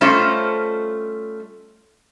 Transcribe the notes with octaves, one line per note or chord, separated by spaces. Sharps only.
G3 A3 C#4 F4 C5 D#5